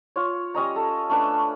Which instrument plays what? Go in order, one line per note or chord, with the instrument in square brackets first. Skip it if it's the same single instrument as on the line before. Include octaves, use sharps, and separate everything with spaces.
[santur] F4 C#5
G3 C#4 D#5 A#5
A4
A3 C#4 D4 B4